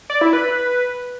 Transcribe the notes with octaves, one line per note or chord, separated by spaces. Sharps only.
D5
E4
B4